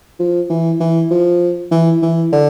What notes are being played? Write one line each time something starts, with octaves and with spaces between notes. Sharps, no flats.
F3
E3
E3
F3
E3
E3
D3